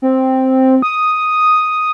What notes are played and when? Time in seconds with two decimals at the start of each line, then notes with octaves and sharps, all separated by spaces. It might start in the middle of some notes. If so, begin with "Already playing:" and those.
0.02 C4
0.82 D#6